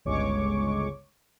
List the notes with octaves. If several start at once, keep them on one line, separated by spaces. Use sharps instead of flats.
G1 C#2 G#3 C#5 C#6 D6